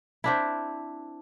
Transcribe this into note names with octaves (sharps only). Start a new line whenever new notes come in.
C4 D4 E4